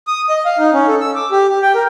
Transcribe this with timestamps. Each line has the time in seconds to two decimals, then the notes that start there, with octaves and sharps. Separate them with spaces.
0.07 D#6
0.29 D#5
0.45 F5
0.59 D#4
0.74 C#4
0.88 A4
1.01 E6
1.15 D6
1.31 G4
1.49 G4
1.62 G5
1.75 A#4